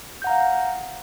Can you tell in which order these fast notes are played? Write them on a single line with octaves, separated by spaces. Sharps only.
G6 F#5 A#5 F5